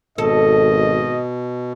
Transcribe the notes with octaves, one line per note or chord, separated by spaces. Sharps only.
G#1 B2 A4 D#5